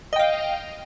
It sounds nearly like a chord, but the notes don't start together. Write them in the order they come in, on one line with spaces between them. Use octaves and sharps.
D#5 G5 F5